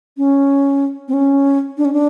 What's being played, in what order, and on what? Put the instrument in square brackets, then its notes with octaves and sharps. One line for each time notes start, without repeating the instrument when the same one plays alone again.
[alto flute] C#4
C4
C#4
D4
C#4
D4